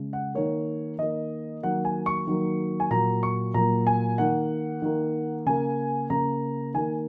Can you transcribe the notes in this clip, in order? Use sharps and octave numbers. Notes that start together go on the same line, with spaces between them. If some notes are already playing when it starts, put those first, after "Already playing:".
Already playing: C#3 G#3
F#5
D#3 A#3 C#5
D#3 A#3 D#5
D#3 F#3 A#3 F#5
G#5
C#6
D#3 F#3 A#3
G#5
A#2 F#3 A#3 A#5
C#6
A#2 F#3 A#3 A#5
G#5
D#3 A#3 F#5
D#3 A#3
C#3 A#3 G#5
C#3 A#3 A#5
D#3 A#3 G#5